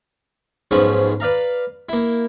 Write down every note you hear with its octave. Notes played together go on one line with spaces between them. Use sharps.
B1 G#2 F3 C#4 B5
B4 D5 F5 A#5
A#3 E4